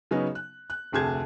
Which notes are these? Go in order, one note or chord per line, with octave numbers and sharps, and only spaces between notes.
C#3 F#3 B3 C#4 D#4
F#6
F#6
F1 D2 C3 G#4 A5 G#6